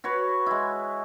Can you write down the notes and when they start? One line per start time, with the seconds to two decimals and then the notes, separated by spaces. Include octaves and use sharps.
0.04 F#4 B4 C#5
0.46 G#3 E4